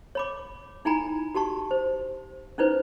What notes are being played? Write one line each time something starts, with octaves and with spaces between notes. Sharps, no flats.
C#5 B5 D6
D#4 E4 G5 G#5 A#5 B5
F#4 G4 A5 C#6
C5
C#4 D#4 E4 B4 C5